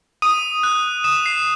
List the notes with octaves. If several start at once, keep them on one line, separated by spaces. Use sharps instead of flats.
D#6 D#7
F#6
D#6 E7
C7